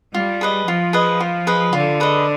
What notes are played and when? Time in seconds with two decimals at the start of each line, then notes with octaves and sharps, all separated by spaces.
0.14 G3 F4
0.41 G#4 B4 D#5
0.67 F3 F4
0.93 G#4 B4 D#5
1.20 F4
1.47 G#4 B4 D#5
1.73 D3 F4
2.00 G#4 B4 D#5